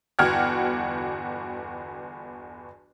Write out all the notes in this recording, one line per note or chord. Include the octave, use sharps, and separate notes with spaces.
G1 E2 F#4 G5 F6 G#6